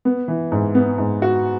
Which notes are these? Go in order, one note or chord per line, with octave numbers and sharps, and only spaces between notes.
B3
E3
G#2
B3
G#2
F#4